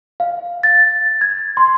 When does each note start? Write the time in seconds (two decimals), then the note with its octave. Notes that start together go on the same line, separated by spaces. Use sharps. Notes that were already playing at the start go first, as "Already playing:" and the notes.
0.20 F5
0.63 A6
1.21 G#6
1.57 C6